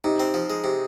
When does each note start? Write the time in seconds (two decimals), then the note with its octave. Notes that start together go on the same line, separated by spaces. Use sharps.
0.04 C3 D#4
0.20 C4
0.34 F3
0.50 G#3
0.64 C3